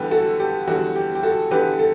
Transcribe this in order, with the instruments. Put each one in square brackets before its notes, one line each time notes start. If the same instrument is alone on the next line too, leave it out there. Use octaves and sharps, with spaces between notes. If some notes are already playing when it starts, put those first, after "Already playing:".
Already playing: [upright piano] E2 D3 G3 G4 B4
F#4 A4
G4
E2 D3 G3 F#4
G4
G4
F#4 A4
E2 D3 G3 G4 B4
A4